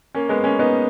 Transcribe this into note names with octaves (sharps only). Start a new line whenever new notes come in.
A#3 C#4
G#3 B3
A#3 C#4
B3 D#4